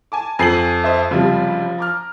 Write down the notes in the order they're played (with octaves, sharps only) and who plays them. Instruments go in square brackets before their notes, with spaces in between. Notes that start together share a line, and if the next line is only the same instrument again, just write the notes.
[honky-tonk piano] G#5 A5 D6
[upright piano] F2 C7 [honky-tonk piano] G#5 F#7
[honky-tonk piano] C5 D#5 E5
[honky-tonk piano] F#1 C3 G3 [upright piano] F3
[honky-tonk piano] A#5 D6 F6